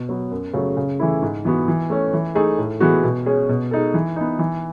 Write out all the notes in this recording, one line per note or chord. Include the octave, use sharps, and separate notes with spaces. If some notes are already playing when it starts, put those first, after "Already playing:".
Already playing: B2
F#3 B3
F#2
C#3 F#3 A3
C#3
E3 A3 E4
G#2
E3 B3 F#4
E3
A3 C#4
E3
A3 D#4 G#4
A2
E3 G#3 B3 F#4
B2
G#3 C#4 G#4
B2
G#3 D#4 A4
E3
B3 D#4
E3